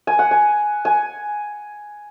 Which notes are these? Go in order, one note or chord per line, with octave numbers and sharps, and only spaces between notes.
G#5
F#5
G#5
G#5